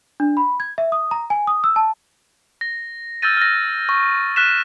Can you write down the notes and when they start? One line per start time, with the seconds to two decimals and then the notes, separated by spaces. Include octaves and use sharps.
0.20 D4
0.37 B5
0.60 G#6
0.78 E5
0.92 D#6
1.11 A#5
1.30 G#5
1.47 D#6
1.64 E6
1.76 A5
2.61 A#6
3.22 E6 F6 G6 A6 A#6 D#7
3.37 F6 A#6
3.89 C#6
4.36 F6 F#6 B6 E7